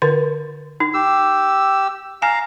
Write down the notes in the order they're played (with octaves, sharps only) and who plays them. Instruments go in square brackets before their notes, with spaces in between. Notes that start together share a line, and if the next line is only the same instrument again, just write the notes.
[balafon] D3 A#4
D#4
[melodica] G4 E6
[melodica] F5 A#5 [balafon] G#5